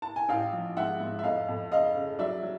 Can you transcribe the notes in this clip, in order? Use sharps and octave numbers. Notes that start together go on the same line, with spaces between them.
A5
G#5
A1 F5 G5
F3
G#2 E5 F#5
G#2
E5
F2 D#5 F5
F2
C#3 D#5 F5
C#3
F#3 D5 E5
F#3